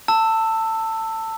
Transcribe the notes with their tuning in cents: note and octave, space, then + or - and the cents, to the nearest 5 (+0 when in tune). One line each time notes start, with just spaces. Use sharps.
A5 +25 E6 +0